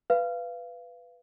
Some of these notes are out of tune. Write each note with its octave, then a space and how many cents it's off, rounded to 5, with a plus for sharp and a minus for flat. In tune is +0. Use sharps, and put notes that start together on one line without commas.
B4 +5 F5 -25